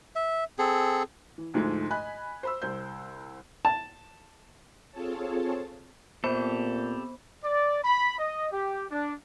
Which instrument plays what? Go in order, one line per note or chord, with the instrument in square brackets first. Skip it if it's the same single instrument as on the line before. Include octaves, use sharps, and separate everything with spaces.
[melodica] E5
C4 G#4 A4
[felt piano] E3
D2 G#2 F3 G#3 A3
D#5 G#5 B5 F#6
C5 B5 E6
C2 C5 G6
[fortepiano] A5
[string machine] C4 F4 G#4 A4 C#5 A5
[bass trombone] A#2 [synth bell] B3 B5 [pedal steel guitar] C4 G4 A4 [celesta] C5
[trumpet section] D5
B5
D#5
G4
D4